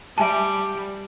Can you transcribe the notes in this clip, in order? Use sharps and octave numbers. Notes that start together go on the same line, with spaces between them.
G3 E5 G#5 A5